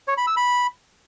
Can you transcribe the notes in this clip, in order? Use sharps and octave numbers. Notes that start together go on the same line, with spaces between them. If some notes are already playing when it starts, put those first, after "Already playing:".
C#5
B5
E6
B5